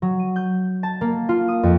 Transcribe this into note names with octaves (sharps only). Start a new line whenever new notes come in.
F#3
D#7
G6
A5
A#3
F4
D#6
F2